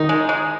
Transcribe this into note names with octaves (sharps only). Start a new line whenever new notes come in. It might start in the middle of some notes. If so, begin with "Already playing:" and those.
Already playing: D#3 D#4
G#3
G#3